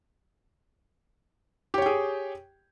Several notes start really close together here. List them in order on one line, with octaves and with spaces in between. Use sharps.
G4 C#5 G5 G#4